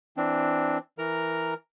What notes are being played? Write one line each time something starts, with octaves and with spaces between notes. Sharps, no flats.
E3 C4 D4
E3 A#4 A#5